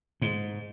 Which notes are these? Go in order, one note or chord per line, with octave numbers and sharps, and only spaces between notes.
G#2